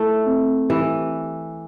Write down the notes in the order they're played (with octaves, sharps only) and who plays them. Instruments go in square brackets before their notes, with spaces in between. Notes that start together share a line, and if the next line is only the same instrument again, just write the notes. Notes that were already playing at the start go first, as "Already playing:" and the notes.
Already playing: [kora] A3 [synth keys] E4
[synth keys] C4
[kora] E3 [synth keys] G4